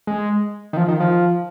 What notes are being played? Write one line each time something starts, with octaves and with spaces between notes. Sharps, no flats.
G#3
D#3
F3
D#3
F3